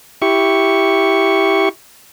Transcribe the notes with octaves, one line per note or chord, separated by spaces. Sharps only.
E4 G4 C#6